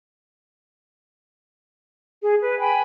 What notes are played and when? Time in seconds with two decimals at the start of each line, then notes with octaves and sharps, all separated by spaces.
2.21 G#4
2.41 B4
2.59 G5 G#5 B5